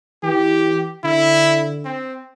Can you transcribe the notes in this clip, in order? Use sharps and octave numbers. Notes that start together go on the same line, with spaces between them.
E3 G4
D3 E4
C4